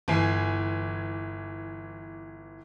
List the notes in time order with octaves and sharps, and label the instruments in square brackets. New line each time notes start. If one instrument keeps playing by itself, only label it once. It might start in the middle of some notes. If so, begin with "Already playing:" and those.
[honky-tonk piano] G1 E3 G#5 C7